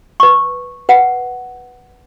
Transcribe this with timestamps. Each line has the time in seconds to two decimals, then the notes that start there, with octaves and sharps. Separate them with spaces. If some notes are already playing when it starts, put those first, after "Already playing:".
0.20 B4 C#6
0.89 B4 F#5